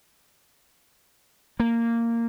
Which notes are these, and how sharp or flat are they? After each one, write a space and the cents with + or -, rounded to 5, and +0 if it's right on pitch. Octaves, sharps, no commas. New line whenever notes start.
A#3 -10